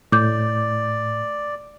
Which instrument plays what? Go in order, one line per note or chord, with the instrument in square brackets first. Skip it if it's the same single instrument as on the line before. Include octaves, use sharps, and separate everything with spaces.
[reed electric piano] A2 [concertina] D5 [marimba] D6 G6